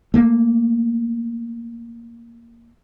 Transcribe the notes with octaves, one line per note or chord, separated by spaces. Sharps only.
A3 A#3